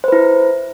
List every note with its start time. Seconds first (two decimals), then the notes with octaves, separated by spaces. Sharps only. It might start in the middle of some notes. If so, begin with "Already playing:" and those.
0.04 C5
0.08 B4
0.12 E4